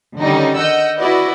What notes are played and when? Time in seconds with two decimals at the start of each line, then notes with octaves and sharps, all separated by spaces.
0.20 D3 D#3 G3 C#4 D#4 D#5
0.58 D#5 F#5 E6 G6
0.97 E4 F#4 B4 D5 D#5 F#5